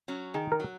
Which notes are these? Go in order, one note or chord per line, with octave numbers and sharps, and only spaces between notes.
F#3 C#4
D#3 G#4
A#4
F#3